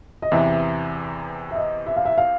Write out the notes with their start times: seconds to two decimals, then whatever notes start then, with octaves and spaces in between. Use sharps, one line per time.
0.22 D#5
0.32 E2 C3 E3 E5
1.51 E5
1.56 D#5
1.86 E5
1.96 F5
2.05 E5
2.18 F5